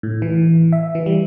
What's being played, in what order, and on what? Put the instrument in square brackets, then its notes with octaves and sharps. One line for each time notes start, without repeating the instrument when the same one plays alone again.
[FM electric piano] A2
E3
E5
E3
G3